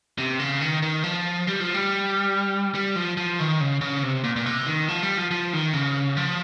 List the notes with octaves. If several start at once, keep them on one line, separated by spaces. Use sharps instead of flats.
C3
C#3
D#3
D#3
F3
G3
F3
G3
G3
F3
F3
D#3
C#3
C#3
C3
A#2
A#2
C3
D#3
F3
G3
F3
F3
D#3
C#3
F3